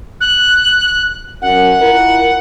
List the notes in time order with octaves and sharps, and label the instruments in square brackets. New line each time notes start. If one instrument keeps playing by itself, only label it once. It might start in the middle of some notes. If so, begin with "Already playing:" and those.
[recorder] F#6
[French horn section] F#2 [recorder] F#5
[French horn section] E4 F4 A#4